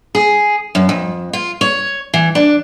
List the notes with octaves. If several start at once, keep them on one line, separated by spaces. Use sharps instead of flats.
G#4
F#2
F2
F4
C#5
E3
D4